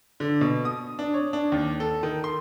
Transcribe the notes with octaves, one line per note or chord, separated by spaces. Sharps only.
D3
B2
D#6
D4
C#5
D4
D#2
A4
D#3
C6